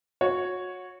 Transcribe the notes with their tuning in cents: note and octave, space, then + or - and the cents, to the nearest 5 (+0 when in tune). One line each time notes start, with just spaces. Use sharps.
F#4 -25 C#5 +0